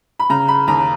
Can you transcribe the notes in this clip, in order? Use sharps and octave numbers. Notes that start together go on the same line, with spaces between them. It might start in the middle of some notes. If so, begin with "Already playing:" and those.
B5
C#3 A#5
B5
D#2 A#5